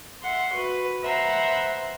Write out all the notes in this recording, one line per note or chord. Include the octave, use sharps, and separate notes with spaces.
E5 F#5 C6
F#4 B4
B4 C5 E5 F#5 A#5 C6